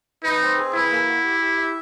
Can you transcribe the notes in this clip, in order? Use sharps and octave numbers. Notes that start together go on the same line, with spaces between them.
D#4 B4
C4
G#4
E4 B4
A#3
F#4
G4
G4
E5